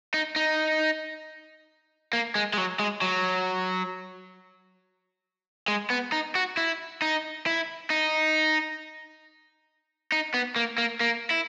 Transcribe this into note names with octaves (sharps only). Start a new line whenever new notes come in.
D#4
D#4
A#3
G#3
G#3
F#3
G#3
F#3
G#3
B3
D#4
F#4
E4
D#4
E4
D#4
D#4
B3
A#3
A#3
A#3
E4